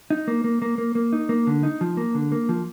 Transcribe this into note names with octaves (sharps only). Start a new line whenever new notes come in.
D#4
A#3
A#3
A#3
A#3
A#3
D#4
A#3
D3
D#4
F3
A#3
D3
A#3
F3